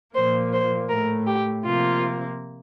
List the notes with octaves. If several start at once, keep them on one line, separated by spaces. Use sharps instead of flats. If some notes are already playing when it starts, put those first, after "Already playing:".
A#2 F3 A#3 C5
C5
A2 A3 A#4
G4
C3 F3 A#3 F4